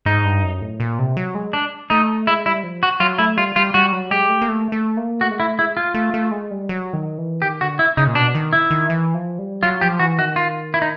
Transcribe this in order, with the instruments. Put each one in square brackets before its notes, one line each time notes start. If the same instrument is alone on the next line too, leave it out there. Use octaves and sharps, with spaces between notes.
[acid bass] G#2 [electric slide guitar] D#4
[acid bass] G2
F#2
A2
A#2
C3
F#3
G#3
[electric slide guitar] D4
[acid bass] A3 [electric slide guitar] D#4
[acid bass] G#3 [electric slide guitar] E4
[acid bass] G3 [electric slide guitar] E4
[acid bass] F3
[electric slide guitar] F#4
[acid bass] F#3 [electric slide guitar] F4
[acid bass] A3 [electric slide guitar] E4
[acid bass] G3 [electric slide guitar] F4
[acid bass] G3 [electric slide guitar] F4
[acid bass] G3 [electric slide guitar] F#4
[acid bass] F#3
[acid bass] G#3 [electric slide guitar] G4
[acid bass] A3
A#3
A3
A3
A#3
[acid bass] A3 [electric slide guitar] F#4
[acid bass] G#3
[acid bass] A3 [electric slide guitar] E4
[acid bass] G#3 [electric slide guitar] E4
[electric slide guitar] F4
[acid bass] A3
A3
G#3
G3
F#3
D#3
E3
[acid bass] D#3 [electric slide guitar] G4
[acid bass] D3 [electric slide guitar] F#4
[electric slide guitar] E4
[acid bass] C#3 [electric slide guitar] D#4
[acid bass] A#2
[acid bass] B2 [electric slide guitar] D4
[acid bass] D#3
[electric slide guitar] E4
[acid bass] D#3
E3
F3
G3
[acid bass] F#3 [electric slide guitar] F4
[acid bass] F3 [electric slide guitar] G4
[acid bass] E3 [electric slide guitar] F#4
[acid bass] D#3 [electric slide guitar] F#4
[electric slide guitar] F4
E4
D#4